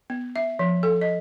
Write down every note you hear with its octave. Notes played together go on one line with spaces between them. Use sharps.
B3
E5
F3
A4
D#5